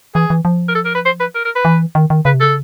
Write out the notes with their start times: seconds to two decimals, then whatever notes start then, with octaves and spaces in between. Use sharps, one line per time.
0.15 E3 G#4
0.30 E3
0.45 F3
0.68 A#4
0.75 A4
0.85 A#4
0.95 B4
1.05 C5
1.20 B4
1.35 A#4
1.45 A#4
1.55 B4
1.65 E3
1.95 D#3
2.10 D#3
2.25 C#3 B4
2.34 C3
2.40 C#3 A4